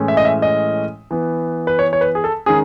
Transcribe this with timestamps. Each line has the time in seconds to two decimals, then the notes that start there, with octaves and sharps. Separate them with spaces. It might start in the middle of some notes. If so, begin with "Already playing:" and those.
Already playing: A2 E3 G#3 C#4
0.08 E5
0.17 D#5
0.25 E5
0.42 D#5
1.11 E3 B3
1.67 B4
1.79 C#5
1.93 C#5
2.01 B4
2.15 G#4
2.24 A4
2.46 D#3 G#3 C#4 G#4